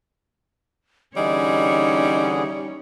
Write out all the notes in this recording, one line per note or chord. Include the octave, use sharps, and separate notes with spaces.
D3 E3 G3 C#4 D#4 G#4 C#5 D#5